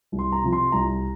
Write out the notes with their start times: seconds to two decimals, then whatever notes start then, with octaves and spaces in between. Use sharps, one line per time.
0.12 C2
0.19 C6
0.32 A#5
0.43 C3 F3
0.53 C6
0.72 C2 A#5